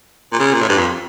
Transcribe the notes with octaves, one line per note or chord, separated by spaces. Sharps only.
A#2
C#3
A#2
A2
G2
F2